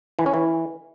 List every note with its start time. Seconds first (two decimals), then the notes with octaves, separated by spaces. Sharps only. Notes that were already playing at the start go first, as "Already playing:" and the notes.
0.19 E3
0.26 C#4
0.34 E3